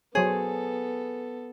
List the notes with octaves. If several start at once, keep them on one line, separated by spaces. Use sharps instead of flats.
F#3 B3 G#4 A4 C5 C#5